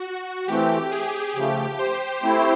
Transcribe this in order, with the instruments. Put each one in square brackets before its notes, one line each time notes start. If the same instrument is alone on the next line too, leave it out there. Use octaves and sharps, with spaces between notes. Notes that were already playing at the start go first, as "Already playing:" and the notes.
Already playing: [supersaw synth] F#4
[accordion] E3 A3 C4 [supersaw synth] G4
[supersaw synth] G#4
[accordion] C#3 F3 A3 [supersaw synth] G4
[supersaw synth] C5
[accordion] A3 C4 E4